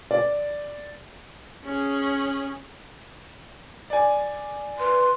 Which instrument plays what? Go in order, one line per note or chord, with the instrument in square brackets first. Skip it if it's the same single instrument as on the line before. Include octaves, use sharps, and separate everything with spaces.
[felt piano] D5
[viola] C#4 G#4
[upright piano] D5 G#5
[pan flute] B4 [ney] C6